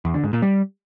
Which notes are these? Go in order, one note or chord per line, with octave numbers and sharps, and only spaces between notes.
E2
D3
G#2
A#2
G3